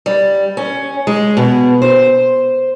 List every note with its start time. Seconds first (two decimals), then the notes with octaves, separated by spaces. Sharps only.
0.06 G3
0.57 C#4
1.07 G#3
1.37 B2
1.82 C5